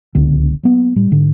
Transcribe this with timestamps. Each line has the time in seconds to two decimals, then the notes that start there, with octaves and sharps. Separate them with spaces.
0.15 D1 C#2 D3 B3
0.63 F#3 A#3 B3
0.96 A2 G3
1.11 G#2 D3